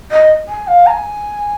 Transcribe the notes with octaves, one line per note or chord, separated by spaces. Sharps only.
D#5
G#5
F5
A#5
G#5